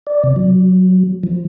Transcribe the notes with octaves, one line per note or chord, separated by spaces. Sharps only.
D5
C3
F#3
F3